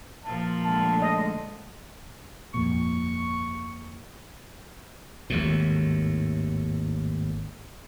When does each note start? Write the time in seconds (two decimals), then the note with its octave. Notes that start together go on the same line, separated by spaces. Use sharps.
0.24 A#2 F3 A5
0.64 D3 G#3 A3 A5
1.02 D#5
2.54 G1 F2 A#2 C#6
5.30 G#1 D#2 A2